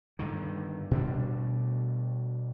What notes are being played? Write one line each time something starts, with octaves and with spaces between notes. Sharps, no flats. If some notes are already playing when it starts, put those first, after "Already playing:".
G2 D3 D#3
B2 G3 D4